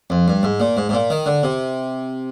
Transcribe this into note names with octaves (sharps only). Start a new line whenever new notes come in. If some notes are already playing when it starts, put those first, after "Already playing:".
F2
G2
G#2
A#2
G#2
G#2
A#2
D#3
D3
C3